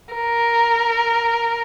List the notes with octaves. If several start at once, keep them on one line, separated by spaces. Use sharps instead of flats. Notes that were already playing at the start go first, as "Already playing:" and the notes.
A#4